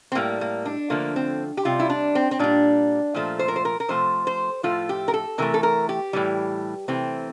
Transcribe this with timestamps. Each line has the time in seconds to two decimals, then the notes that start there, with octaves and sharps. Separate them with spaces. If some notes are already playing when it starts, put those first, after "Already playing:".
0.12 C4
0.15 A2 G3 A#3
0.41 A#3
0.65 D4
0.90 D3 F3 A3 A#3
1.16 C4
1.57 G4
1.65 C3 G3 F4
1.79 E4
1.89 D4
2.15 C4
2.31 C4
2.39 A#2 G3 D4
3.14 A#2 F3 A3
3.39 C5
3.48 A#4
3.56 C5
3.65 A#4
3.80 A#4
3.88 C3 F3 A3 C5
4.27 C5
4.63 A2 F3 A3 F4
4.89 G4
5.08 A#4
5.14 A4
5.38 C3 E3 A3 A#4
5.54 A4
5.63 A#4
5.89 G4
6.13 A2 E3 G3
6.88 C3 E3 A3 C4